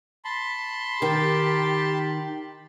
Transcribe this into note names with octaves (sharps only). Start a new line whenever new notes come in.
A5 B5 C6
D#3 G4